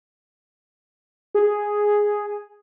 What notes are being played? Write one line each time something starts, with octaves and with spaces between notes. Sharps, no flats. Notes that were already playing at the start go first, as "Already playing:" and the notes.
G#4